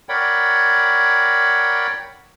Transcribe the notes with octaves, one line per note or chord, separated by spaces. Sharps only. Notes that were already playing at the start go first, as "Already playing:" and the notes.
A#4 C#5 D5 F#5 G5 B5